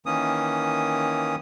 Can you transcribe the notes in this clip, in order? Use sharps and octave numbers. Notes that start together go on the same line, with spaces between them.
D#3 E3 A#3 C#4 D#6